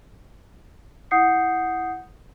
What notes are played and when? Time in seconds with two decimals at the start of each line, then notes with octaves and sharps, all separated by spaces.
1.11 E4 F#5 D#6 G6 C7 C#7